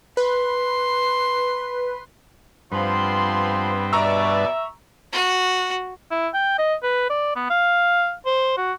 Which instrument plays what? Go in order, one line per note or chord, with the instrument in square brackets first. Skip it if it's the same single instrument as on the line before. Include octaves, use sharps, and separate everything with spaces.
[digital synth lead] B4 [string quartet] C6
[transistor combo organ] G2 B4 [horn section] F3 C6 [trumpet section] B3 C4
[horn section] B2 D5 [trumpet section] E5 [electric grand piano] A#5 C#6 E6
[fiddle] F#4
[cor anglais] E4
G5
D#5
B4
D5
B3
F5
C5
F#4